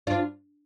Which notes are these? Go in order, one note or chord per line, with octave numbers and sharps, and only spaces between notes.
D4 F4